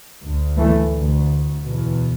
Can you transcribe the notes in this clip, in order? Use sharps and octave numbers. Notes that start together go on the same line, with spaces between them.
D2
E3 A3
D2
E2 B2